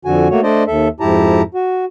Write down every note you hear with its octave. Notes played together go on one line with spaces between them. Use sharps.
F2 D3 F#4 G#5
A3 A#3 F#4 C#5
A3 D4 C5 D5 D#5
D#2 A4 E5
F2 G#2 E4 G4 A5 A#5
F#4